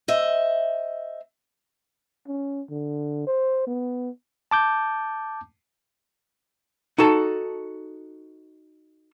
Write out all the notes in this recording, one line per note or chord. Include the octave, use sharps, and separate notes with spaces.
C5 D#5 E5
C#4
D3
C5
B3
A5 D6 G6
D#4 F#4 A4 A5